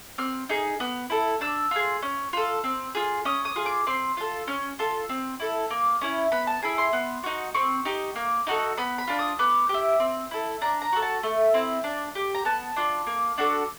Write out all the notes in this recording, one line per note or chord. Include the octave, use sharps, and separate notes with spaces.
C4 F6
D#4 G#4
B3
E4 A4
D4 E6
F4 G#4
C#4
F4 A4
C4
F4 G#4
C#4 D#6
D#6
F4 G#4
D6
C4 C6
F4 A4
C#4
F4 A4
C4
E4 A4
A#3
C#4 E4
B3 B5
A5
E4 G#4 B5
C6
B3
D#4 F#4
C4 C#6
D#4 G4
A#3
D#4 F#4 A4
B3 B5
B5
D4 F4
D#6
B3 D6
E4 G4
C4
E4 A4
D4 A#5
A#5
F#4 A4
A5
A3
C4 E4
D4
G4
A#5
B3 A5
D4 F4
A#3
D4 F#4 A4